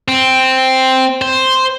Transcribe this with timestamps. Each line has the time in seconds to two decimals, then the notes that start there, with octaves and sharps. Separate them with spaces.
0.08 C4
1.22 C5